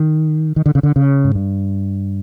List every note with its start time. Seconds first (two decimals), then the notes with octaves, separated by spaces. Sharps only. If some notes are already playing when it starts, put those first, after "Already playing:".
Already playing: D#3
0.56 D#3
0.66 D3
0.75 C#3
0.83 D3
0.96 C#3
1.25 G#2
1.35 G2